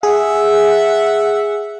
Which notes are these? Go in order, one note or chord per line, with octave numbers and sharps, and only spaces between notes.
G#4 E5 F#5